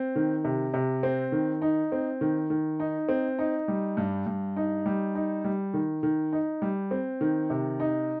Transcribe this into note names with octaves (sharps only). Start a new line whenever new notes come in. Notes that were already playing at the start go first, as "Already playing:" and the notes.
Already playing: C4
D#3
C3
C3
C4
D#3
D#4
C4
D#3
D#3
D#4
C4
D#4
G3
G2
G2
D#4
G3
D#4
G3
D#3
D#3
D#4
G3
C4
D#3
C3
D#4